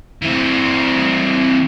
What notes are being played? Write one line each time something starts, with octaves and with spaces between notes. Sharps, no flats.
E3 C4